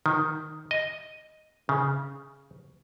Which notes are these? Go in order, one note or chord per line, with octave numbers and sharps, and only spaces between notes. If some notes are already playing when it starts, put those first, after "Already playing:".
D#3
D#5
C#3